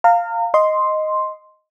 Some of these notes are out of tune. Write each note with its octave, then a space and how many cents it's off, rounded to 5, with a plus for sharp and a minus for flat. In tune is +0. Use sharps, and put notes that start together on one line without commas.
F5 +0 A#5 -35
D#5 +0 C6 +0